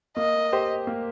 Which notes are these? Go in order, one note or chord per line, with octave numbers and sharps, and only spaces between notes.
A#3 D#5
G4 C5
A#3